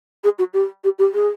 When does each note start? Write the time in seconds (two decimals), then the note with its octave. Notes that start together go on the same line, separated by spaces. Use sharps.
0.24 G#4
0.39 F#4
0.53 G4
0.84 G4
0.99 G4
1.14 G#4